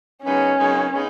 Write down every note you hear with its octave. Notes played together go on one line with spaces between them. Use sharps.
F#2 C#3 G#3 B3 C#4 D#4
F#2 C#3 G#3 B3 D#4
C#3 G#3 B3 D#4